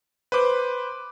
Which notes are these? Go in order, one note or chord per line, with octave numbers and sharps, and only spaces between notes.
B4 C5 D6